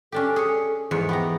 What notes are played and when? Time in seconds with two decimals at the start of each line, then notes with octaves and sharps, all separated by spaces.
0.12 C#4 D4 G4 A4
0.36 G#4 C#5
0.91 E2 G#2 F3 C#5
1.09 B3 G4 A#5